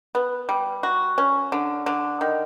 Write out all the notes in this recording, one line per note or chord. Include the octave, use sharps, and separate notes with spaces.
B3
G3
F#4
C#4
D3
D3
D#3